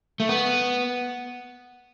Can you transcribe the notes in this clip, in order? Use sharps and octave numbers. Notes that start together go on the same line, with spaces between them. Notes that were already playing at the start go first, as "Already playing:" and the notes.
A3
B3